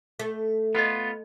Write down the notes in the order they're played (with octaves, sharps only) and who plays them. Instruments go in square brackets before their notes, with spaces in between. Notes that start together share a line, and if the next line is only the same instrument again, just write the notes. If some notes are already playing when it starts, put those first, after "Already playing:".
[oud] A3
[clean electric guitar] B3 F4 [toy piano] A4 D#5